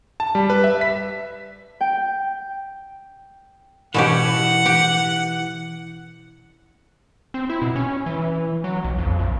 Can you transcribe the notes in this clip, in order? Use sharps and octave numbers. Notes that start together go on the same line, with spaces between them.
A5
G3
B4
E5
B6
G5
B2 E3 C#4 G4 F#5
G4
C4
E4
B2
C#4
E3
F#3
B1
F2
A#1